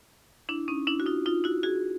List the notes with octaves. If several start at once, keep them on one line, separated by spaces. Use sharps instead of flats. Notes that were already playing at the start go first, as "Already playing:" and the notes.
D4 E4
C#4 D#4
D4 E4
F#4
D#4 F4
D#4 F4
E4 F#4
F#4 G#4